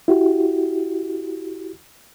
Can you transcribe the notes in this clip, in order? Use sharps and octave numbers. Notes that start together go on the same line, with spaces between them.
E4 F#4 G4